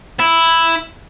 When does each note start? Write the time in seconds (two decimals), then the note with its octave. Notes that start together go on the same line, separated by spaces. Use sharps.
0.20 E4